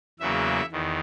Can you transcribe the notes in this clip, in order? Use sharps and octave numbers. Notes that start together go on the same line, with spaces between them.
E2 C#3 F#3 A#3 E5
E2 D#3